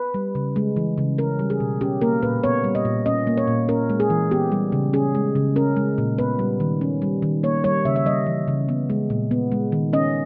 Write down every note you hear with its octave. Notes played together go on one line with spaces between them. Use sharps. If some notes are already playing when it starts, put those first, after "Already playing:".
Already playing: B4
G3
C#3
G#3
E3
C#3
C#4 A#4
G3
G#4
B2
C#4 G4
A#3 A#4
A#2 B4
B3 C#5
G3
D#5
A#2
C#4 D#5
A#3
C#5
A#2
C#4 A#4
G#3
G#4
E3
B3 G4
G3
C#3
C#4 G#4
G#3
C#3
C#4 A#4
G#3
A#2
B3 B4
G3
D#3
C#4
G3
D#3
A#3 C#5
G3 C#5
C#3 E5
E5
G3 D#5
E3
C#3
B3
G#3
A#2
B3
G#3
D#3
C#4 D#5